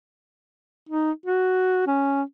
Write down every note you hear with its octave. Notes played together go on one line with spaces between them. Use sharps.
D#4
F#4
C#4